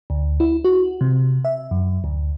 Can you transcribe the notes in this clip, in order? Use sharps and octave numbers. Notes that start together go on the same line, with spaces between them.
D2
E4
F#4
C3
E5
F#2
D2